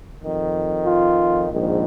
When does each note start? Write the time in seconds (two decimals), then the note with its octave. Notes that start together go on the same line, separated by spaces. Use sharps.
0.23 F2 D#3
0.86 F4
1.49 A#1 G#2 D#3